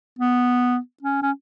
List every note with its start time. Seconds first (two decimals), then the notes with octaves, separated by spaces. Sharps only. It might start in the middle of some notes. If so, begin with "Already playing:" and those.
0.19 B3
1.03 C#4
1.22 C#4